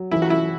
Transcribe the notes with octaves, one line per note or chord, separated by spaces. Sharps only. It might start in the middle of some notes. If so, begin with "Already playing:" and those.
Already playing: F#3
E3 E4
F#4
E4